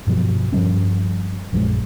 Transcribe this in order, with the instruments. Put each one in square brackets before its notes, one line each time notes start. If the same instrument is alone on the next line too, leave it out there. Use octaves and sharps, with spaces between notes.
[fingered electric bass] G2 B2 F3 F#3
G2 F3 G3 C#4
A#1 F#2 F3 G#3